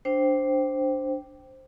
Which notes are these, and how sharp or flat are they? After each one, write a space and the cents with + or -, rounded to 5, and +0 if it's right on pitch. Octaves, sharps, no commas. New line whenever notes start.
D4 +0 C5 +0 G5 -10